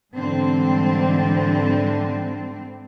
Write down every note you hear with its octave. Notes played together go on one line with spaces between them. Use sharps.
G#2 D3 E3 G3 C4 D4